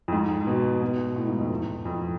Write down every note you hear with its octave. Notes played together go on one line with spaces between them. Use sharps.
F2
G#2
B2
B2
A2
G#2
F2
E2
F2